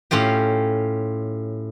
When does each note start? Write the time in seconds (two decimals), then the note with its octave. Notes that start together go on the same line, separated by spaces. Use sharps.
0.11 A2 C#4 F4 G4